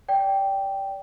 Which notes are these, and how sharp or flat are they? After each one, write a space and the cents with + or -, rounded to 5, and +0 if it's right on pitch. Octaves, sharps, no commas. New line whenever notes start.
D5 -25 G5 +0